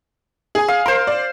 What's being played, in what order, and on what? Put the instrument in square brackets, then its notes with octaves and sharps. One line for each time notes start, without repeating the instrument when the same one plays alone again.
[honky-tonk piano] G#4 G#5
[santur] F5
[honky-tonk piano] A#4 [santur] C5 C6
[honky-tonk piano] D5